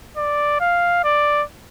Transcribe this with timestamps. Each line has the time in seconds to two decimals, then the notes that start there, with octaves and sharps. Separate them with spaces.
0.17 D5
0.60 F5
1.04 D5